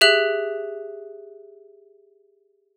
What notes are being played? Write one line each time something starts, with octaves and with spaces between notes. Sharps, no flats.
G4 G#4 E5 F#6 F#7